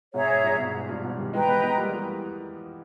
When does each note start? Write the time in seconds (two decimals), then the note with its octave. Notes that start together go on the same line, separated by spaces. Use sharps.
0.14 G#2 B2 G#4 C#5 E5 A#5
0.29 G#2
0.43 G2 A#2
0.58 G#2 B2
0.74 G#2
0.89 G2 A#2
1.04 G#2 B2
1.19 D#3 G3
1.33 E3 G#3 B4 G5 A#5
1.48 G#3 B3
1.63 G#3 B3
1.78 G3 A#3
1.93 E3 G#3